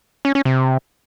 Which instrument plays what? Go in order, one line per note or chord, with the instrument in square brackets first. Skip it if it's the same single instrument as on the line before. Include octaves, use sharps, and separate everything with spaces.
[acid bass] C#4
C#4
C3